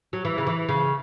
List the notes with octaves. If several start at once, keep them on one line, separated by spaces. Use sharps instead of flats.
F#3
E3
C#3
E3
C#3